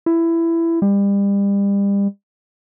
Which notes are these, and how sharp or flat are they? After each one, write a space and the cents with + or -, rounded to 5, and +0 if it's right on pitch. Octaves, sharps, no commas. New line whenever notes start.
E4 +15
G3 +35